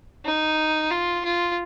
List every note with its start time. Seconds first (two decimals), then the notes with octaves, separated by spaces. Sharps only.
0.25 D#4
0.91 F4
1.24 F4